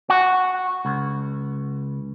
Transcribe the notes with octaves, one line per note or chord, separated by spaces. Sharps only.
F#4
C#2